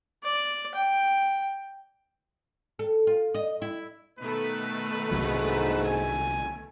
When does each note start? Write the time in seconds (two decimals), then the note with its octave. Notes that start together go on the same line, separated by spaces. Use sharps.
0.24 D5
0.75 G5
2.79 A4
3.07 F4
3.35 D#5
3.62 E4
4.19 B2 D#3 A3 D#4 B4
5.12 C2 G#2 D3 F#3
5.85 G#5